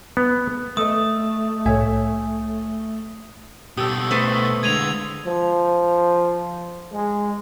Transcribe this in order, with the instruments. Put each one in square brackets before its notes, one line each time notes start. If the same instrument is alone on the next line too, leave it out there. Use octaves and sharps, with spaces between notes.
[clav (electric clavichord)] B3
[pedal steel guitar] A3 [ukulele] A4 D#5 [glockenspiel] D#6
[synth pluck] C2 A2 G#5 [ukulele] A4 C#5 E5
[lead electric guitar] B2 A4 [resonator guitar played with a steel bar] G4 [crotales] D#6 E6
[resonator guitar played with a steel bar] A3 B4 C5
[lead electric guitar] D3 G#3 [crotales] G#6 D#7 F7
[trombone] F3
G#3